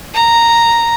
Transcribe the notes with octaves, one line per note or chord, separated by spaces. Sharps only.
A#5